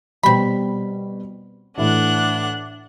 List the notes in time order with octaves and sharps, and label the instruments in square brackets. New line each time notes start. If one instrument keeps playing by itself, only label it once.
[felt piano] B2 G3 [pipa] C4 B5
[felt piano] A2 E3 [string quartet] D4 F#5 F#6